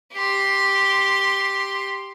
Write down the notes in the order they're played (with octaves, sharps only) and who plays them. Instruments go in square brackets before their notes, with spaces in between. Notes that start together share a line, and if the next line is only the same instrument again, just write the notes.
[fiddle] G4 C6